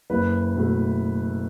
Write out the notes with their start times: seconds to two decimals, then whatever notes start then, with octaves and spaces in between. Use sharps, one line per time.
0.10 F#1 B4
0.56 B2 A3